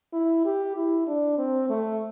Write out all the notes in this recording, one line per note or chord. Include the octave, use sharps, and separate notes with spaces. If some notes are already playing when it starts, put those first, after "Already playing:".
E4
G4
E4
D4
C4
A3